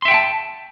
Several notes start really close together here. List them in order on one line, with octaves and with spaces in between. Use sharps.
C6 E5 G5 F#5 A5